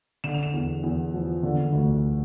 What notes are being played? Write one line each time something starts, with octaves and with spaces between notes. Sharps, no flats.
D3 E7
F7
E7
E2
E2
F3
D3
D2